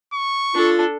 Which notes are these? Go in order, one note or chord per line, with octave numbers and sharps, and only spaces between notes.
C#6
D4 F4 A4